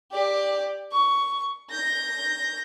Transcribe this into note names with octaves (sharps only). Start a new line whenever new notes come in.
G4 D5
C#6
G6 A#6